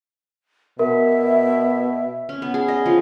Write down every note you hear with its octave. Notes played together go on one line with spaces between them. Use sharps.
B2 A#4 E5
C#4
B3
G#4
D#5
F3